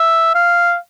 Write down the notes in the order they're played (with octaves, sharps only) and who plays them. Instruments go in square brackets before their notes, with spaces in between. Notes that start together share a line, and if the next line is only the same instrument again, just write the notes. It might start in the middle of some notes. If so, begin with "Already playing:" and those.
Already playing: [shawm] E5
F5